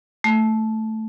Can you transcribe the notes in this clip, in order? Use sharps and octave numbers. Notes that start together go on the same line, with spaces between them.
A3